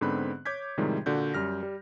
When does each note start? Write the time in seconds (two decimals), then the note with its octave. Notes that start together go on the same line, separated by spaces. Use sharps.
0.01 G#2 D3 B3 C4 B5 F#6
0.46 C#5 D6 G6 G#6 B6
0.77 A2 C3 D#3 F3 G3 G#3
1.06 A#2 D3 F#4 G6
1.34 F#2 G3 F6 A#6
1.63 G3